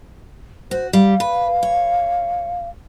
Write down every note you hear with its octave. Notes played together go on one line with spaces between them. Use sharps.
F#4 C5
G3 F5
B4
C#5